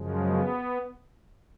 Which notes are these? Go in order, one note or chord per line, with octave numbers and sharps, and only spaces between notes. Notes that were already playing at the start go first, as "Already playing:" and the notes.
Already playing: F#2 C#3 F3 G#3
B3